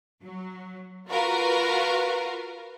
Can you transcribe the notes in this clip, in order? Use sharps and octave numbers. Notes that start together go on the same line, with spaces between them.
F#3
F4 F#4 A#4 B4 F5